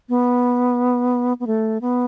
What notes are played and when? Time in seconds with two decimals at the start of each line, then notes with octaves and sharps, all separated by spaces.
0.09 B3
1.40 B3
1.47 A3
1.81 B3